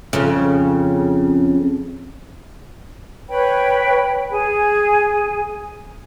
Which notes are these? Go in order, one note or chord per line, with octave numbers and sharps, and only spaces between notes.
F2 C#3
B4 C#5 G5 B5
G#4 G#5